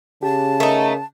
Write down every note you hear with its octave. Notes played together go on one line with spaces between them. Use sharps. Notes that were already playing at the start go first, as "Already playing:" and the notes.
C#3 G4 A5
A3 D#4 A#4